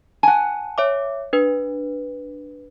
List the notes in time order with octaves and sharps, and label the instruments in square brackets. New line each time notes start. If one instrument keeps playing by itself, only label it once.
[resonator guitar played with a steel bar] F#5 G#5 [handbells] A5
[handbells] C#5 E5 D6
D4 B4